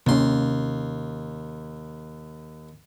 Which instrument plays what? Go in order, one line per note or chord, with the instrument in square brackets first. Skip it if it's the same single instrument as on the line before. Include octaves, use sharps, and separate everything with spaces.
[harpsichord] D#2 C6 [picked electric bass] C3 A#3 C#4